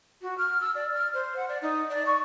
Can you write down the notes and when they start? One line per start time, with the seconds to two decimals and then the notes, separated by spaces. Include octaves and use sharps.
0.22 F#4
0.38 F6
0.61 E6
0.75 D5
0.94 F6
1.13 C5
1.36 F#5
1.49 D5
1.61 D#4
1.90 D5
2.06 C#6